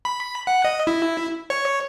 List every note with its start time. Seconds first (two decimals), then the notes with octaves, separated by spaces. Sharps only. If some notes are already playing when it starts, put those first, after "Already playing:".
0.05 B5
0.47 F#5
0.65 D#5
0.87 E4
1.50 C#5